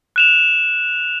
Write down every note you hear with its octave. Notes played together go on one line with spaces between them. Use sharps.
F#6 E7 F7